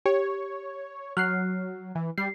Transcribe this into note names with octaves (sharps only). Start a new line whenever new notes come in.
G4 C#5
F#3 F6 F#6 C7
E3
G3 C7